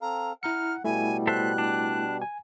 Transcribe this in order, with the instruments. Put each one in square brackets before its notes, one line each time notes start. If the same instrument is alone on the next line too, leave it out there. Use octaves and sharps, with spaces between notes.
[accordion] C4 A4 F5 [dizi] A#5
[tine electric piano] E4 A#5 C#7 [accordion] F#5 [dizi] F6
[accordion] B2 G3 [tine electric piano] A3 E4 [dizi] G#5
[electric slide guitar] A4 C5 E5 [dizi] F#6
[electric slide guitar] D4
[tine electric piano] G#5